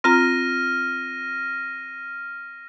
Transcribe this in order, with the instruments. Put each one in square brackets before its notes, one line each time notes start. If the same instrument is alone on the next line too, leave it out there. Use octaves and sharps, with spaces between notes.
[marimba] C4 F4 A#5 [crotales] F6 A#6 D#7